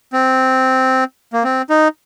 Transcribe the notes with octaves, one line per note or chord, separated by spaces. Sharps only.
C4
A#3
C4
D#4